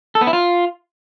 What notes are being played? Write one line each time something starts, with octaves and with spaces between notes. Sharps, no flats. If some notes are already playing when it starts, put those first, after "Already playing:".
A4
B3
E4
F4